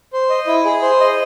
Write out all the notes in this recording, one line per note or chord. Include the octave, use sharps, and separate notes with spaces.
C5
D#5
E4
G#4
C5
D#5